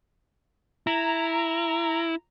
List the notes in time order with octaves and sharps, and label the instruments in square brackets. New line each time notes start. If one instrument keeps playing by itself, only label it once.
[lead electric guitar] E4 [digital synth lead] A#5